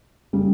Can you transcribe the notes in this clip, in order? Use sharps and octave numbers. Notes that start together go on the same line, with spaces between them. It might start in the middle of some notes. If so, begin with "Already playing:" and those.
C#3 G3